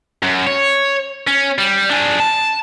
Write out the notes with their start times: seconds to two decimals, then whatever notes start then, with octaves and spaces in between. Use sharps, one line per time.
0.23 F#2
0.47 C#5
1.27 C#4
1.58 G3
1.91 D4 G#4
2.20 A5